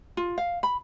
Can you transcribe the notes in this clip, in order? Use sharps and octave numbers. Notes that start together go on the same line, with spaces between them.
F4
F5
B5